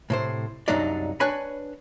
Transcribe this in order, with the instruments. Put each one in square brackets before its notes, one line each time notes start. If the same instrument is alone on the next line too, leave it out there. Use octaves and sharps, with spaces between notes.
[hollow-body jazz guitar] A2 C3 C5
C2 F#2 F#3 D4 D#4 D5
D4 B4 C#5 G#5 B5